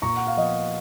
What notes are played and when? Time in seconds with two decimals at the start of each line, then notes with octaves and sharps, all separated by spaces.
0.02 A#2 A#5 C#6
0.16 F#5
0.27 F5
0.37 F3 B3 D#5